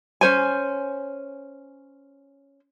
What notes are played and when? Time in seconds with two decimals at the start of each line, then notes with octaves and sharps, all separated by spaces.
0.21 C#4 C5 G#5